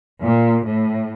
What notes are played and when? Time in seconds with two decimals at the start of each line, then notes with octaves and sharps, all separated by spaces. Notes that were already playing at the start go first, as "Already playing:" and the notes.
0.22 A#2
0.65 A2